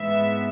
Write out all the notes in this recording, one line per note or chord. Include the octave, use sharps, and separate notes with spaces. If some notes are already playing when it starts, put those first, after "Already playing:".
Already playing: G#2 E3 G#3 B3 E5